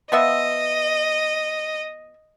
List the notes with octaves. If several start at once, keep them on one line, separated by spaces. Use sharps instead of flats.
F3 B3 D#5 E5